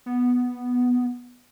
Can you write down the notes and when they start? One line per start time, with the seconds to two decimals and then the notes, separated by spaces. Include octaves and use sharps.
0.06 B3